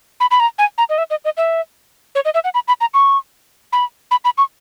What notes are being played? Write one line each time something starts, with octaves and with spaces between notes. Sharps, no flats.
B5
B5
A#5
G#5
A#5
D#5
E5
D#5
D#5
E5
C#5
D#5
E5
F#5
B5
B5
A#5
C#6
B5
B5
B5
C#6